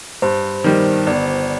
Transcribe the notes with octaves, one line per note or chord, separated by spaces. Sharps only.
G2 C5
D#3 G3
G1 D5